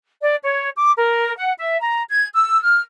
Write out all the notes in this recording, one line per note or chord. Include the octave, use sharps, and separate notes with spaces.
D5
C#5
D6
A#4
F#5
E5
A#5
G#6
E6
F6